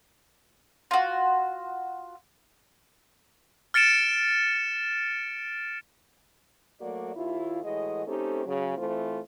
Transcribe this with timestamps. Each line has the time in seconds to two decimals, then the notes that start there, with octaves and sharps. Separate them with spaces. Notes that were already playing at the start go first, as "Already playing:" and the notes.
0.91 F4 F#4
3.74 F6 A6 C#7 D7 E7
6.80 F#3 A3 A#3 F#4 D5
7.15 D#2 E4 F4
7.63 A2 E3 G#3 F#4 D#5
8.06 A3 C4 C#4 D#4 G4 A4
8.46 C#3 F#3
8.77 E3 A3 C4 F4 C5